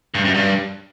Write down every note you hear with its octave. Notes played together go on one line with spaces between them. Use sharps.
G2
F#2
G2